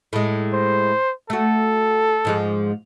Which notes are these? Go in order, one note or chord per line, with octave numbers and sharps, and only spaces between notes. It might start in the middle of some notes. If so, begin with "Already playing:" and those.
A2 G#3
C5
A3 F#4 A4
G#2 F3 G#3